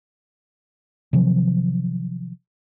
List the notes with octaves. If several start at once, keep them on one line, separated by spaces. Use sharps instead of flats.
C3 D#3 F3 F#3